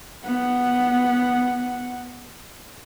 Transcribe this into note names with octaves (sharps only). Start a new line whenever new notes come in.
B3 F#5